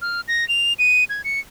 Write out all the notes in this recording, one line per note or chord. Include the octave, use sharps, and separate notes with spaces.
F6
A#6
F7
D#7
G#6
C#7